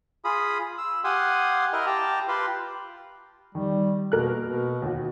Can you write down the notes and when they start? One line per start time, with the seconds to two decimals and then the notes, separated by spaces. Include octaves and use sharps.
0.25 F4 G#4 B5 D#6
0.78 E6
1.04 G4 F5 F#5 G#5 C6 D#6
1.73 E4 A#4 D#5 F6
1.86 G4 G5 A5 A#5
2.28 F4 G4 B4 C6
3.55 D#3 G3
4.12 B2 A#3 A#4 F#6
4.42 B2
4.82 D#2 F#4